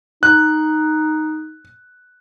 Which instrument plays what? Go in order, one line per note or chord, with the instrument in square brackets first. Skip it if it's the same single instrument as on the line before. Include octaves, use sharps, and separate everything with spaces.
[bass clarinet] D#4 [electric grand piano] F#6